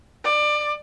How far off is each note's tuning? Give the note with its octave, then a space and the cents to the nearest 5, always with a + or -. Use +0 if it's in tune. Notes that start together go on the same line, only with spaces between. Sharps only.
D5 +25